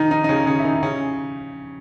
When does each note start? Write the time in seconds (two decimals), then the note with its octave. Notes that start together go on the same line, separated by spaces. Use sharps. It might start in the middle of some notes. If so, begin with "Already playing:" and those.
Already playing: D#3 D#4
0.11 D#3 D#4
0.24 D#4
0.29 C#3 C#4
0.46 C#3 C#4
0.59 E4
0.64 D#3 D#4
0.83 C#3 C#4